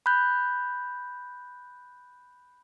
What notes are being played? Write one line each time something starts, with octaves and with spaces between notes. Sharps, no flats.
B5 F#6 G6